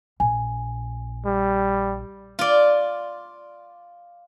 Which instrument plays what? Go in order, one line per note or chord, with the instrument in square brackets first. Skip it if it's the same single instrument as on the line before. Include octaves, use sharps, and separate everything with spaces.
[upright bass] A#1 [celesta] G#5
[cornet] G3
[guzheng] F4 D5